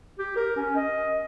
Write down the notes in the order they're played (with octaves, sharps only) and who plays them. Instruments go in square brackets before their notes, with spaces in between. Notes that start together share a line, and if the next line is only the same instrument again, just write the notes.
[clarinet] G4
A#4
C#4
D#5